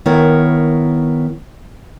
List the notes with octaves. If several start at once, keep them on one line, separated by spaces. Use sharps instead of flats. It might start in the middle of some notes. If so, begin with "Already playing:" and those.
D#3 B3 E4 A#4 C#5